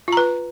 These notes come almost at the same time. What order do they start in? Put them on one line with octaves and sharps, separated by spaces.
F4 A#5 B4